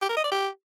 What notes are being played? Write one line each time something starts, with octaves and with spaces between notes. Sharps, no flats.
G4
A#4
D#5
D5
G4